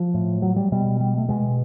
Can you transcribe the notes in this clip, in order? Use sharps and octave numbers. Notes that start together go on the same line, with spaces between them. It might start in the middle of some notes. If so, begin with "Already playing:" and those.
Already playing: F3
A2
F#3
G3
B2 G3
G3
A3
B2 G#3